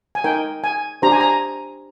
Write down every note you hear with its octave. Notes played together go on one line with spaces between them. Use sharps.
G#5
D#4 A#4 G5
G#5
D4 G4 C5 A#5
G#5
A#5